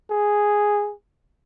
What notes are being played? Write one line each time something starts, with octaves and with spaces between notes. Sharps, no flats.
G#4